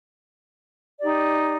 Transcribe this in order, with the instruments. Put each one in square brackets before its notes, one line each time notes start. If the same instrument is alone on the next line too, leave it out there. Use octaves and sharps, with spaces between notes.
[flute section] D#4 G4 D5